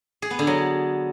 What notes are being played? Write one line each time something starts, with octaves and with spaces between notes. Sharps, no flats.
G#4
B3
D3
F#3